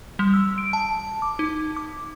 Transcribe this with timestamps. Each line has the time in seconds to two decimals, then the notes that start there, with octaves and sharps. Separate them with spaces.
0.19 G3
0.34 E6
0.58 D7
0.73 A5
1.22 D6
1.39 D#4
1.76 D6